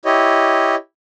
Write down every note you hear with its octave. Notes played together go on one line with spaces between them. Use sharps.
E4 G4 C#5 D#5